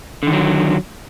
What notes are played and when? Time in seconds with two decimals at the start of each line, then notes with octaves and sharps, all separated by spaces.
0.23 D3
0.27 D#3
0.32 F#3